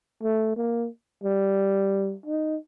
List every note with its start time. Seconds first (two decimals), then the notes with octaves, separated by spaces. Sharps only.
0.22 A3
0.56 A#3
1.24 G3
2.26 D#4